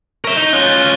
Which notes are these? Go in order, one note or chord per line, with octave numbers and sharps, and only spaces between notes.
A#4 E5 C#6 G7
D#4
C#4 F4 F#6 G7
A6
F6 D#7